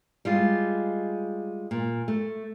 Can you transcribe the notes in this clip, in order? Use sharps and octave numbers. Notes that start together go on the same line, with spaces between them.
G3 G#3 F4
A#2
A3